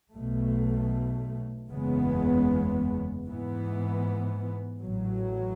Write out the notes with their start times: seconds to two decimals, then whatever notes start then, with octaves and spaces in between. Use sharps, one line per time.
0.13 B1 B2 A3
1.69 F#1 E2 C#3 G#3 B3
3.26 G#2 E3 B3
4.82 A1 A2 F#3